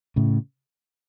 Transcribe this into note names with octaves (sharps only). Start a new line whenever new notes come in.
A2 C#3